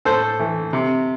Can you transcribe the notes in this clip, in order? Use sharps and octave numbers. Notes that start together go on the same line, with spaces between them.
A2 A4 C5
E3 A3
C3